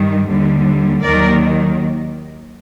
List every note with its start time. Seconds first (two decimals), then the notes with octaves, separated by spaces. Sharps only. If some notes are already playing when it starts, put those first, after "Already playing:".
Already playing: G2 D#3 G3
0.29 D#2 D3 G3
1.03 D#2 D#3 F#3 A#4 D5